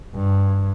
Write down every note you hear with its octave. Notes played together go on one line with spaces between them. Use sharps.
G2